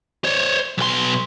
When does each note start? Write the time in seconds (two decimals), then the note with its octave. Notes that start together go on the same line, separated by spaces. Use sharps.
0.24 C5 C#5
0.78 B1 C6